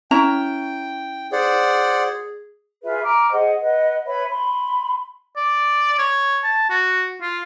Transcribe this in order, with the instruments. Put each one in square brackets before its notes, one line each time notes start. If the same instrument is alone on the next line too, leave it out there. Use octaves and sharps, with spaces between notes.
[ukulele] C#4 E4 A#5 [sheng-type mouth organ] G5
[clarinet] G#4 [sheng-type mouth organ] C5 D5 F#5
[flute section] F4 G#4 B4 E5
A#5 D6 F6
G#4 C5 D#5 F#5
B4 D#5 F#5
B4 C#5 E5 B5
B5 C6
[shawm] D5
C#5
A5
F#4
F4